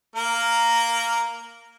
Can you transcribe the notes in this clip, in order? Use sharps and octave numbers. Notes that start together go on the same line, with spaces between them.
A#3 A#4 A#5